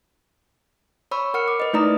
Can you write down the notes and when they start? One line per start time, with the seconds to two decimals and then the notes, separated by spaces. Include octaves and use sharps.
1.11 C#5 B5 C#6 E6
1.34 A#4 F#5 F6 C#7
1.48 D6
1.60 B4 D#5
1.73 A3 D#4 E4 D5 A#5 D#6